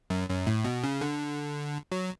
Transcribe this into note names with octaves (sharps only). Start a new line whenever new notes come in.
F#2
F#2
A2
B2
C#3
D3
F#3